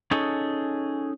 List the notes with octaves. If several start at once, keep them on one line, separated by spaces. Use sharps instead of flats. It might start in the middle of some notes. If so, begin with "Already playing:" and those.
C#4 D#4 G#4 A4 C#5